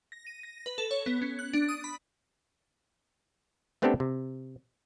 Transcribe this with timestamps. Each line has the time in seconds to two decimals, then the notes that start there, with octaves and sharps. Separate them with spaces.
0.12 A#6
0.27 D#7
0.43 A#6
0.66 B4
0.78 A4
0.91 C#5
1.06 B3
1.22 C#4
1.39 F#6
1.53 D4
1.69 D#6
1.84 B5
3.82 A3 B3 C4 D4 G4 A4
4.00 C3